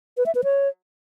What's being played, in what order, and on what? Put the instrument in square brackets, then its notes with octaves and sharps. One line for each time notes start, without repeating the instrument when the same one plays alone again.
[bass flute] B4
E5
B4
C#5